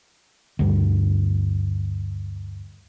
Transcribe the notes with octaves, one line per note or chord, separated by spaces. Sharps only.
D2 G2